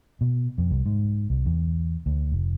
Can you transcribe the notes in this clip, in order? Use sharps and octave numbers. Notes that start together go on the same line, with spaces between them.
B2
F2
C2
G#2
C2
E2
D2
F1